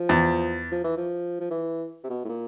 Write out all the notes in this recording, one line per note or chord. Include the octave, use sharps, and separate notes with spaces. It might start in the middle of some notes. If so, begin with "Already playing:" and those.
Already playing: F3
E2
F3
E3
F3
F3
E3
C3
B2
A2
A#2